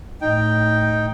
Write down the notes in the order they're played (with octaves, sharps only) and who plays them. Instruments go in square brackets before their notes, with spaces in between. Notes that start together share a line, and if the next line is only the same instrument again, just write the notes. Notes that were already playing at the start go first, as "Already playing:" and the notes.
[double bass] A2 [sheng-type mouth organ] D#4 G5